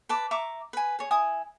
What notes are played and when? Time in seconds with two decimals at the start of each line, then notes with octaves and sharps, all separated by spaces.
0.09 B4 A5 D6
0.31 E5 A#5 C#6 D6
0.73 B4 G#5
0.99 G#4 C#5
1.11 E4 G#5 D#6